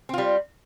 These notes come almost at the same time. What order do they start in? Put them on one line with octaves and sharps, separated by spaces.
C4 F4 G3